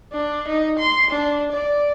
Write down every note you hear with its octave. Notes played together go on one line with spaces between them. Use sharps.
D4
D#4
C6
D4
D5